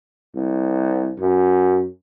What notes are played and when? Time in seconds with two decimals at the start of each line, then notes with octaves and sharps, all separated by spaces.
0.35 C2
1.19 F#2